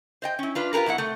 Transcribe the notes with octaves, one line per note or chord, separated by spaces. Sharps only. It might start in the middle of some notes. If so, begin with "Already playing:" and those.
C5 D#5 G5
C#4 E4
D4 F4 B4
F4 G4 G#4 A#4 B4
B2 F#3 E4 F#5
C3 A3